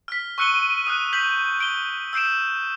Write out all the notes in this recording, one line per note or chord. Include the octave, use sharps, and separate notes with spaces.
F6 B6
C#6 E6 F#6 C#7 D#7 G7
D#6 F6 F#6
G6 B6 F#7
D7 G7
E6 G6 C7 D7 E7